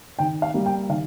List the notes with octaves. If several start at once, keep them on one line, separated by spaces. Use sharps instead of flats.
D#3 G5
F5
G3 A#3
G5
D#3 F5